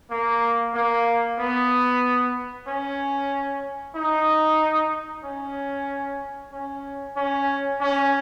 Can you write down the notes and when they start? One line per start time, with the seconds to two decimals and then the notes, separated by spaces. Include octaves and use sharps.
0.10 A#3
0.74 A#3
1.39 B3
2.68 C#4
3.96 D#4
5.24 C#4
6.52 C#4
7.17 C#4
7.81 C#4